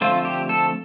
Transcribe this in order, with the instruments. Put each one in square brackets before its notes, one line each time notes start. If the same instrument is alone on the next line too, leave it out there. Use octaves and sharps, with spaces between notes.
[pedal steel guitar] D3 F3 A3 C4 F4
G4
A4